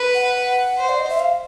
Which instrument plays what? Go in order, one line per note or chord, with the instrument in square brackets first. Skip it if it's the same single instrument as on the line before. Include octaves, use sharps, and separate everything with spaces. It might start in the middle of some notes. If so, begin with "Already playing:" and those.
Already playing: [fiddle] B4
[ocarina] F#5
[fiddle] C5
[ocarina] D5
D#5
E5
F5